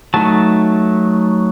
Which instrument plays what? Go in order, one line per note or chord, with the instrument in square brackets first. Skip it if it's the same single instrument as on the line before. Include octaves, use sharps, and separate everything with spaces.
[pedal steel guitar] F#3 A3 D#4 A5